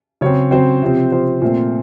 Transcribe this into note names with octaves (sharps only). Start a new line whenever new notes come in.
C#3 F#3 C4 C#5
C#3 F#3 C4 C5
C3 F3 C4
C3 F3 C4 C5
A#2 A3 C4